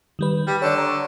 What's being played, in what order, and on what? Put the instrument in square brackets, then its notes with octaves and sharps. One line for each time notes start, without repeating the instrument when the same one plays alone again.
[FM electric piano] D#3 G3 B4
[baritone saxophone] G3
[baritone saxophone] D3 [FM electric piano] C#5 D5
[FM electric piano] A#5 C#6